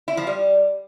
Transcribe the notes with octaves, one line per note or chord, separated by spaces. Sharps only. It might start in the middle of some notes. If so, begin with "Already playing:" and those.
E4
F3
G3